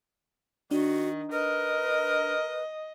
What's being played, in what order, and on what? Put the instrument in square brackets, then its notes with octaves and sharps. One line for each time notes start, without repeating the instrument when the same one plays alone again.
[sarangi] D#3 [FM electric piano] D4 [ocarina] F#4
[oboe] A#4 [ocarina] B4 [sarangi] D#5